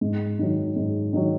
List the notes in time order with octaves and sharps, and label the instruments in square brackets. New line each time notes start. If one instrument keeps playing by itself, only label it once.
[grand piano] G#2
D#3 F#3
G#2
D#3 F#3